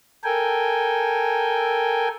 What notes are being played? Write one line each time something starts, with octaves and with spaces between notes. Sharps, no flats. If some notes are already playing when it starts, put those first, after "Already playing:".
A4 A#4 G5 G#5